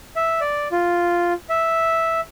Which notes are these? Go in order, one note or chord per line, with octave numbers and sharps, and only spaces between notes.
E5
D5
F4
E5